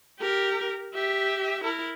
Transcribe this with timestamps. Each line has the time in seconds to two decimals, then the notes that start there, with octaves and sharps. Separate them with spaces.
0.20 G4 A#4
0.94 G4 E5
1.64 E4 A#4